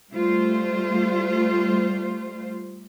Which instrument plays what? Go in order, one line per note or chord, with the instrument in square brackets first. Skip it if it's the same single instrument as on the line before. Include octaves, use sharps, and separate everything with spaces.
[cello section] G3 A3 F4 C5